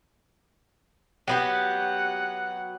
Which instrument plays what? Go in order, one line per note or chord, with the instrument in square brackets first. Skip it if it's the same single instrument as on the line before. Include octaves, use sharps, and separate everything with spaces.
[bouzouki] F#3 B3 G4 [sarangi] F#5